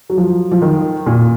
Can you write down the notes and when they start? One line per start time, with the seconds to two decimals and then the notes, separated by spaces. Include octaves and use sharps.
0.10 F#3
0.18 F3
0.52 F3
0.62 D#3
1.06 A#2